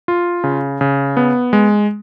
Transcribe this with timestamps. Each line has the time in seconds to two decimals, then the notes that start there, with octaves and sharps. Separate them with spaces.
0.08 F4
0.44 C#3
0.81 C#3
1.17 B3
1.53 G#3